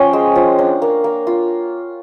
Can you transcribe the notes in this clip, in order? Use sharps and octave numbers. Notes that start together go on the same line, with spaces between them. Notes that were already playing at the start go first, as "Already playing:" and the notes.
Already playing: F3 C#4 F4 G5
G#3
F3
D4 F#5
A#3
A#3
F4